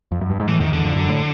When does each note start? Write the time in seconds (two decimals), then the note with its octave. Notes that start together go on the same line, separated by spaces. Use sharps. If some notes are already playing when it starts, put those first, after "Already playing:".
0.12 F2
0.21 F#2
0.30 G2
0.40 G#2
0.48 A2 E3
0.60 E2 D#3
0.72 E2 D3
0.85 F2
0.96 F#2
1.09 A2